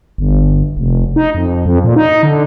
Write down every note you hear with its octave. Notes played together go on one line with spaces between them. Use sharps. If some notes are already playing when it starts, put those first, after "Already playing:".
G1
F1
D#4
F2
F2
A#2
D#4
D3